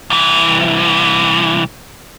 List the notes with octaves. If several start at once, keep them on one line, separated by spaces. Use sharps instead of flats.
C2 E3